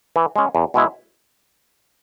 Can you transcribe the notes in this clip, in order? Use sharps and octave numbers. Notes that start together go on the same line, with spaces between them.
E3
G#3 C#4
E2
B2 G#3 E4